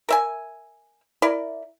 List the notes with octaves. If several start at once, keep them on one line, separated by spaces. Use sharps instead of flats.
A#4 E5 G#5
E4 A#4 D5